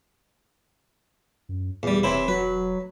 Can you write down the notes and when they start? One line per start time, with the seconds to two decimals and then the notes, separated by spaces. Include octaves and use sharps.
1.49 F#2
1.83 E2 A#2 G3
2.03 E1 C3 E3 C4 E4 C#5 B5 C6
2.28 F#3 F#4 B4